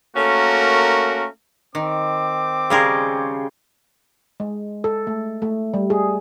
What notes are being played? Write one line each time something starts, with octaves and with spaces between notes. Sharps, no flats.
A3 A#3 C#4 F#4 A#4
D#3 C4 D6
C#3 G3 G4 G#4 A#4 C6
G#3
A4
A3
A3
G3
G#4